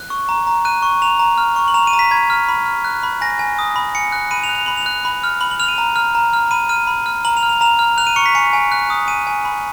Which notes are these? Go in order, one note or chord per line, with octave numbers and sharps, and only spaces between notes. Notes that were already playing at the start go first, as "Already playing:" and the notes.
Already playing: F#6
C#6
A#5
A#5
F#6 D#7
C#6
A#5 F7
A#5
F6
C#6
F#7
A#5 F7
D#7
A#5
B6
B5 G#6
F6
B5
F6
F#6
B5
G#5 A#6
G#5
D#6
B5
G#5 C#7
F#6
B5 D#7
F7
F#6
F7
B5 F#7
F7
F#6
B5
F6
B5 F#7
F#7
F6 F7
D#7
A#5
F6
A#5
F6
B5 D#7
F6 D#7
B5
F6
A#5 F#7
F7
F6
F7
A#5 F7
F6
F#6 F7
D#7
C#6 C#7
B6
G#5 C#7
G#5
F#6
D#6
G#5 D#7
G#5
B5